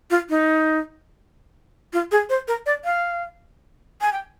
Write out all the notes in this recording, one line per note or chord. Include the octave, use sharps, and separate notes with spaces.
F4
D#4
F4
G#4
C5
A#4
D5
F5
G#5
G5